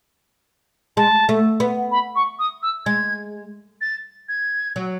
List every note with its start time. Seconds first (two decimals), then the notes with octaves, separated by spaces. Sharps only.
0.97 G#3 A5
1.29 A3
1.60 B3
1.91 B5
2.16 C#6
2.39 D#6
2.63 E6
2.86 G#3 G#6
3.81 A6
4.29 G#6
4.76 F#3